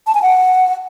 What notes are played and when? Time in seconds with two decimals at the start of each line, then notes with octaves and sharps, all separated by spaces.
0.07 A5
0.15 G#5
0.22 F#5